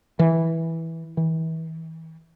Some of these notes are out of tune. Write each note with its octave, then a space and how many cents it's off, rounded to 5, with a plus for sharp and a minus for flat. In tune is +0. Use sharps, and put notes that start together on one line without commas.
E3 -10
E3 -35